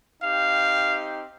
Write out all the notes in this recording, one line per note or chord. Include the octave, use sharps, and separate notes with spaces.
C4 D#4 G4 F5